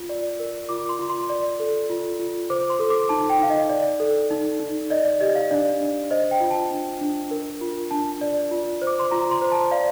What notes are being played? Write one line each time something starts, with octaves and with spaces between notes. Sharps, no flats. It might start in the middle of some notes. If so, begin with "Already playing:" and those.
Already playing: F4
D5
A#4
F4 D6
C6
F4
C6
D5
A4
F4
F4
C5 D6
C6
A4
D6
D#4 A5
G5
D#4 F5
D#5
D5
A4
D#4
D#4
D5 D#5
D5
G4 D#5
F5
D4 D5
D4
C5 D#5
G5
F4
A5
D4
D4
A#4
F4
D4 A5
D5
F4
C5
D6
C6
F4 A#5
C6
C5
A5
D5 F5